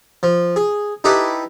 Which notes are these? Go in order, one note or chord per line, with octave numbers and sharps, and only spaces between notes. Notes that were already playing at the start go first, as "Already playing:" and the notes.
F3
G#4
D#4 E4 G4 A4 B4